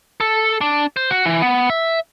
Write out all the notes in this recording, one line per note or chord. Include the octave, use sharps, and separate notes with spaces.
A4
D4
C5
F#4
E3
B3
E5